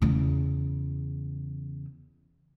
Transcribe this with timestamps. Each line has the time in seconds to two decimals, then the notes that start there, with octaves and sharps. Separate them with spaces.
0.02 E2 C#3